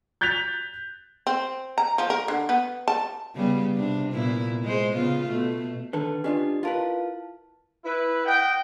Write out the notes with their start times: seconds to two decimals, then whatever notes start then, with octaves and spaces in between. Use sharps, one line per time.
0.21 F#6 G6 A6 B6 F7
1.27 C4
1.78 A#5
1.98 F3
2.10 A#4
2.28 D3
2.49 B3
2.88 A5
3.35 C#3 G3 B3
3.77 C3 D4
4.12 A#2 B3 E4
4.64 G#3 C5
4.94 C#3 B3 F4
5.29 B2 A3
5.93 D3 D#3 A4 B4 A5
6.24 C#4 D4 F4 G4 D5 D#5
6.63 E4 F4 A#4 B4 F5 A5
7.84 E4 B4
8.25 D#5 F#5 G5